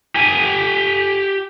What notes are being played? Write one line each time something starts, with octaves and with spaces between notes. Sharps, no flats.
G4 G#5